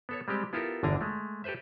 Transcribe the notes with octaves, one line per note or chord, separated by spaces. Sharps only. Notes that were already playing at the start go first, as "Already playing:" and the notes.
B3 A4 C#5
G3 G#3 C4 G4
B3 E4 F4 G4 A4 A#4
G1 E2 D3 D4 G#5 A#5
G#3 A3
G4 A4 B4 C5 E5